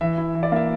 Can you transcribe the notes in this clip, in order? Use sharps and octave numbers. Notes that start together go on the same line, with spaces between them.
E3 E5
E4
E3
D5
A#3 E5